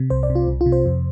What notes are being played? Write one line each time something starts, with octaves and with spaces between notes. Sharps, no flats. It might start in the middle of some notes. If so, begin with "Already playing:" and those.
Already playing: C3
C2 C5
D5
C3
F4
C2
F4
C3
C5
F2